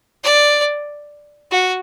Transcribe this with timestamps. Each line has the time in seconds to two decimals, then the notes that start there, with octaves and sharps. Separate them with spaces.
0.24 D5
1.51 F#4